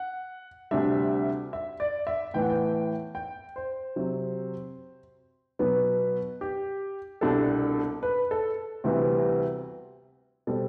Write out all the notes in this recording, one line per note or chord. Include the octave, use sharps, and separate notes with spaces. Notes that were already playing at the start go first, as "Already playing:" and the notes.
Already playing: F#5
D2 C3 G3 D4 E5
E5
D5
E5
A2 E3 B3 G5
F#5
G5
G5
C5
C3 F#3 C4
B2 F#3 B3 B4
G4
C2 B2 G3 D4 A4
B4
A4
D2 C3 E3 G3 B3
B2 G3 C4 A4